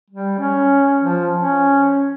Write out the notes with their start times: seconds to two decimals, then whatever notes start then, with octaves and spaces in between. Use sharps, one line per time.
0.10 G3
0.39 C#4
0.99 F3
1.38 C#4